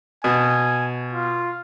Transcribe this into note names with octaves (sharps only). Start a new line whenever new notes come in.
B2 G#5
F4